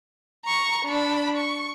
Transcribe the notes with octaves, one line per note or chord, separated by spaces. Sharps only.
A#5 C#6
D4 B5
C#6